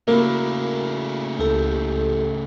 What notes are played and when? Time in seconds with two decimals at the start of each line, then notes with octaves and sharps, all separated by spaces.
0.08 C#3 A3 A#3 E4 F#4 B5
1.39 C#2 E4 G4 A4